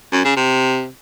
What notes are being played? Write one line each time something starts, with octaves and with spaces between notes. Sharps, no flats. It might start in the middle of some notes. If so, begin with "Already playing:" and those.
F#2
C#3
C3